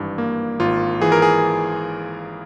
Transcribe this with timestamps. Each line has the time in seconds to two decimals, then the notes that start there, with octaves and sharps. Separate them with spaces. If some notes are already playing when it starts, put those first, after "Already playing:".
Already playing: G#1 G2 E3
0.18 A#3
0.59 G#1 F4
1.01 E3 G#4
1.12 A#4
1.22 G#4